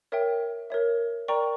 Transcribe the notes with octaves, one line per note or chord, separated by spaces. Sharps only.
A#4 C#5 E5 G5
A#4 C#5 E5
A#4 D5 G5 A#5 C#6